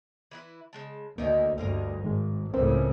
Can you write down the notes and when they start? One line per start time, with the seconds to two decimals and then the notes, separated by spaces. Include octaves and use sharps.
0.31 E3 E4 B4
0.73 C#3 G#3 A5
1.18 D2 D#3 A#3 D#4 E4
1.58 D2 G2 A#4 D#5 F5
2.04 G#1 D#3 G#3
2.54 C#2 A2 C#3 A3 C4 A#4 C5